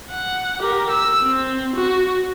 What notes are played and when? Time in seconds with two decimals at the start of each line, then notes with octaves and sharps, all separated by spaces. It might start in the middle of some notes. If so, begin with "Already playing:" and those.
0.11 F#5
0.59 G4 A#4
0.90 E6
1.23 C4
1.76 F#4